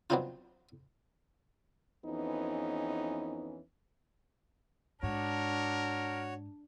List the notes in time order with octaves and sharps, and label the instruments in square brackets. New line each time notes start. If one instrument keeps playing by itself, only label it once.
[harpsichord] F#3 B3 C4 D4 D#4 F4
[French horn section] F2 E3 B3 C#4 D#4
[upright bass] G#2 [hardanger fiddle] D4 [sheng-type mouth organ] F#4 C#5 [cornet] A#4